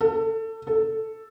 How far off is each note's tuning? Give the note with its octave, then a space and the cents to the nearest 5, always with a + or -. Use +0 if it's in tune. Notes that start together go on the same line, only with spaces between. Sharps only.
A4 +25
A4 +5